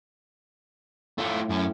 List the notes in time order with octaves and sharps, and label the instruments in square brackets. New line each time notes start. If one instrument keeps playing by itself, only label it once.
[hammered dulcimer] A2 [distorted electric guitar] A3 F4
[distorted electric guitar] F#2 C#4